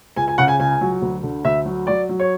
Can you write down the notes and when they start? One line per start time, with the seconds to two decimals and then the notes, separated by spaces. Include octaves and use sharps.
0.16 C#2 G#5
0.28 G#5
0.38 C#3 F#5
0.48 G#5
0.60 C#2 G#5
0.81 F#3
1.02 D2
1.23 D3
1.45 D2 E5
1.65 F#3
1.87 F#3 D5
2.09 F#3
2.20 C#5